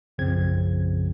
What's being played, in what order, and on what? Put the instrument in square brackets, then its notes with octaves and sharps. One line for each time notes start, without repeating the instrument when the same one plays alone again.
[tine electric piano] B1 F#2 C#3 F3 C4 G#6